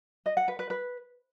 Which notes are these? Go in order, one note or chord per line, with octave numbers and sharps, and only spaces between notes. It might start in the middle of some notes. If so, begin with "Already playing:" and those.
D#5
F#5
B4
B4
B4